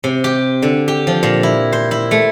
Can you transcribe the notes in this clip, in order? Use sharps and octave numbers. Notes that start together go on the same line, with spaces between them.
C3
G4
D3
G4
F3
A#2
E4
C5
E4
A3